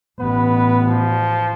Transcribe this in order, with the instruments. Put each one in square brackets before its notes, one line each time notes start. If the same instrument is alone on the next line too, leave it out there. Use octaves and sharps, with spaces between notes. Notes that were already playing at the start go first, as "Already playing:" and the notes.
[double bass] A1 [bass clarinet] B3 [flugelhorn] B4
[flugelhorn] F3